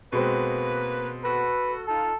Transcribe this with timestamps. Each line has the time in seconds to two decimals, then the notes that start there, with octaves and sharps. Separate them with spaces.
0.13 B2 G#3 A#3 C4 B4
1.24 F#4 A4 B4
1.87 D#4 F4 A4